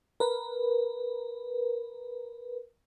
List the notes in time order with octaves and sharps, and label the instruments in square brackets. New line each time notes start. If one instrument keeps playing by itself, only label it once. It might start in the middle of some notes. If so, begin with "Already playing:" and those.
[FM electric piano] A#4 B4